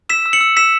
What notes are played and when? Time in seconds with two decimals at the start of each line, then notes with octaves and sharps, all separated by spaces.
0.09 E6 B6 E7
0.26 E6
0.33 C#7 F#7
0.41 E6
0.57 E6 B6 E7